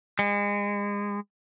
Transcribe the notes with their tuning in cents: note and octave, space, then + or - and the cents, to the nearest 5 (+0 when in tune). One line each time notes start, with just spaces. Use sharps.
G#3 -30